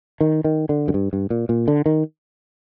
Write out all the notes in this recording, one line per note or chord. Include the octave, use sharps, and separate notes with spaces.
D#3
D#3
D3
F#2
G2
G2
A#2
A#2
D3
D#3